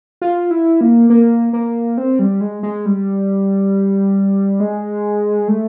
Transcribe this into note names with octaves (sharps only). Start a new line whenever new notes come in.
F4
E4
A#3
A#3
A#3
C4
G3
G#3
G#3
G3
G#3
A3